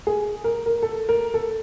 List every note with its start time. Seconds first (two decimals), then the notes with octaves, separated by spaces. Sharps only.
0.07 G#4
0.44 A#4
0.66 A#4
0.82 A4
1.09 A#4
1.34 A4